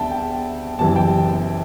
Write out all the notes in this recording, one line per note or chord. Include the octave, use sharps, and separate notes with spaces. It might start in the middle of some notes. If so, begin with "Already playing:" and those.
Already playing: D2 D3 G3 D5 E5 G5 A5
G5
F#1 F#2 E3 G3 A5
G5